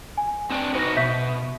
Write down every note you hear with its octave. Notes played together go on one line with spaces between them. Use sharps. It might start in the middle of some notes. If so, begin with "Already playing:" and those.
G#5
C4 D4 G5
D#4 F#4 B4 C5 A#6
B2 E5 G6 B6